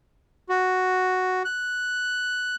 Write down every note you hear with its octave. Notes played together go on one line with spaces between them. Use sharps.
F#4
F#6